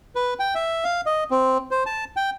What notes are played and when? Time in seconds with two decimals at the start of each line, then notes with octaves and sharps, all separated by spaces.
0.15 B4
0.39 G5
0.55 E5
0.84 F5
1.06 D#5
1.31 C4
1.71 C5
1.86 A5
2.16 G5